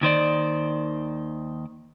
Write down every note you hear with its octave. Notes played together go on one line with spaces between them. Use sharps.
D#2 D#3 C5 D5